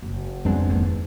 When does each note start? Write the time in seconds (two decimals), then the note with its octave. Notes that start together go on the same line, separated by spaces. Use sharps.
0.02 F#1
0.45 F2 G#3 B3 C4 D4
0.70 D#2 A#3